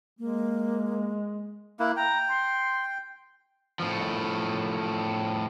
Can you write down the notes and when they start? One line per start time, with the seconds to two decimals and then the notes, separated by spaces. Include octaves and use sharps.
0.19 G#3 A#3
1.79 A#3 E4 F#6
1.96 G5 A#5
2.28 C6
3.80 A2 F3